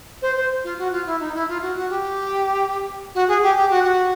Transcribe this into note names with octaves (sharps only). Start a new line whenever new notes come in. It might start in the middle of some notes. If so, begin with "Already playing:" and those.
C5
C5
F4
F#4
F4
E4
D#4
E4
F4
F#4
F#4
G4
F#4
G#4
G4
G4
F#4
F#4